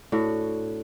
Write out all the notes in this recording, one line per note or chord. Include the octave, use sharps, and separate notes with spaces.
A2 D4 F#4